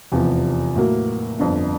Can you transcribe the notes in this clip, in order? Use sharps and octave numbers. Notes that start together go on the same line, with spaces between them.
F1 E2 C3 F3
A2 F#3 A#3
G1 F2 D3